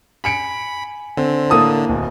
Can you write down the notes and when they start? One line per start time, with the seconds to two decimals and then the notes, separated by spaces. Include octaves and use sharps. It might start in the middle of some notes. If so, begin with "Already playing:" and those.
0.24 G#5 B5 C#7 D7
1.17 D3 C4
1.50 A2 A#3 E4 A5 D#6
1.89 D1